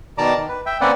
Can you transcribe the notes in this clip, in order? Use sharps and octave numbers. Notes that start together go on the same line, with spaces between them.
B2 D#3 D5 A5 A#5 D6
D#3
B4
E5 G5
A#3 C4 C#4 B4 D5 F#5